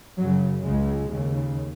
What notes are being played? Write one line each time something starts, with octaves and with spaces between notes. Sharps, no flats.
F#2 C#3 F#3
C#2 C#3 G#3
D#2 C#3